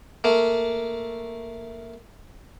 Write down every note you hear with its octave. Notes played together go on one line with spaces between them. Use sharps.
A3 A#3